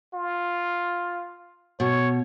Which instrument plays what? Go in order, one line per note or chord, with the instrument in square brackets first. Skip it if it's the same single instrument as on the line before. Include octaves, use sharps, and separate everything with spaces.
[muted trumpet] F4
[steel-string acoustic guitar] B2 [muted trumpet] C#5